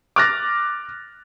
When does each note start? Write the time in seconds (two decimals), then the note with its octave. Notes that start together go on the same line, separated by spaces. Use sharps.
0.16 D6 F6 F#6 A6 A#6